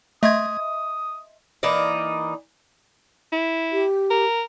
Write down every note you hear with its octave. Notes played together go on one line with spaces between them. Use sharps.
A3 D#5 E5 C6 D#6 G#6
E3 A#3 D#4 D5
E4
G4
A#4